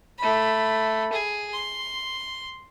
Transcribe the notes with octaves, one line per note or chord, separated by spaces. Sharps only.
A3 B5
G#4
C6